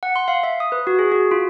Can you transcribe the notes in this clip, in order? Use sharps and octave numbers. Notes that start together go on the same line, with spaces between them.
F#5
C6
F5
E5
D#6
B4
F#4
G#4
F#4
F4